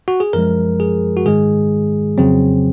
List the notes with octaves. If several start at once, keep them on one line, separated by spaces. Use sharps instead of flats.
F#4
G#4
F#2 F3 G#3 A#4
G#4
F#4
G#2 D#3 G#3 G#4
F2 C#3 F#3 C4